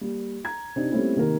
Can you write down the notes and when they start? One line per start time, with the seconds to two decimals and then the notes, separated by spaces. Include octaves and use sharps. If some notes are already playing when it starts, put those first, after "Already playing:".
0.01 G3 A#3
0.44 A#5 G#6
0.76 C3 C4 D4 D#4
0.91 G3 A3 A#3 C4 C#4 E4
1.16 C3 D#3 A#3 A#4